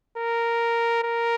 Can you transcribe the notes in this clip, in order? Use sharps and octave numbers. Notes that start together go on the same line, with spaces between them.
A#4
A#4